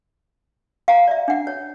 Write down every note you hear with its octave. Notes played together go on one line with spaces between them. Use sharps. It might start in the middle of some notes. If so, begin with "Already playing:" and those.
F5 G5 A#5
D5 E5
D4 F#5
C#5